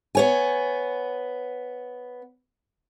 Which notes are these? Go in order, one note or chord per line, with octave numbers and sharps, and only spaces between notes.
B3 C#5 G#5